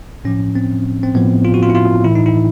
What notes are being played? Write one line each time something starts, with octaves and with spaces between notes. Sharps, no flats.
A2 F3 C#4
C4
C4
A2 F3 B3
F4
F#4
F4
E4
F4
A2 E3 E4
D#4
E4